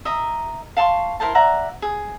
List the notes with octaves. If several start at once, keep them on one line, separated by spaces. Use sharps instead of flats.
D#5 E5 A#5
F5 A5 C6 C#6
E4 A#4 C5 A5
D5 E5 F#5 A#5
G#4